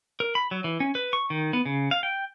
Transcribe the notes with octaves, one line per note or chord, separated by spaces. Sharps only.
A#4
B5
F#3
E3
C#4
B4
C#6
D#3
B3
C#3
F5
G5